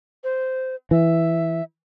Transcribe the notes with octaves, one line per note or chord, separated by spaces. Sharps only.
C5
E3 E5